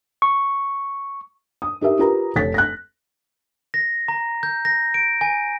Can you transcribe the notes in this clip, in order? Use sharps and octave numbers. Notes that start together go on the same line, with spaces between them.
C#6
D#6
D#4 G4 A#4 E5
F4 G4 A#4 B4 A#5
F1 C#5 A6 B6
F#6 A#6
A#6
A#5
G6
A#6
D7
G#5